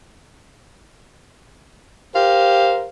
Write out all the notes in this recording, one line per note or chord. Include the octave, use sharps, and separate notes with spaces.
G4 A#4 C5 F5